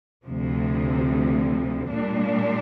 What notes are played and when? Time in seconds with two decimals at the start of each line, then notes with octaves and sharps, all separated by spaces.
0.25 D2 C3 F3
1.90 A#2 G3 D4